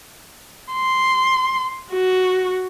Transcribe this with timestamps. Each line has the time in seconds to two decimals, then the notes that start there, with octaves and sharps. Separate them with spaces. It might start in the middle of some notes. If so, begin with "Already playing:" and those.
0.73 C6
1.92 F#4